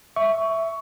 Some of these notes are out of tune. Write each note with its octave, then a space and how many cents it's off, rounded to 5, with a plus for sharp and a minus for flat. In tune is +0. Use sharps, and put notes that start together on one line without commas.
E5 +0 C#6 +15